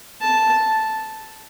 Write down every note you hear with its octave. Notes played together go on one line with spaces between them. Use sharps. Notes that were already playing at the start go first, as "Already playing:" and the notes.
A5